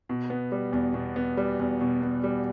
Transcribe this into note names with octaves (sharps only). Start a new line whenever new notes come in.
B2
B3
G3
E2
B2
B3
G3
E2
B2
B3
G3